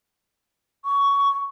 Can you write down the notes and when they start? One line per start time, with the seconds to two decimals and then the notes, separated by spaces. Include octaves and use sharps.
0.85 C#6